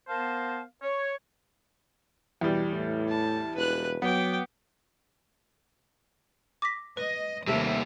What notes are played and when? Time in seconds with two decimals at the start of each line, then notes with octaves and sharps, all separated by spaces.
0.09 B3 A#4 C5 F5 A5
0.83 C#5
2.41 E2 B2 G3
2.72 A2
3.09 A5
3.56 E1 B4 F#6
4.02 F#3 B3 G5 D6
6.62 D6 A#6 B6
6.97 B4 D#5
7.48 D#2 C3 G3 A3 A#3